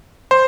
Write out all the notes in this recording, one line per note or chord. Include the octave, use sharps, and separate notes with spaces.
C5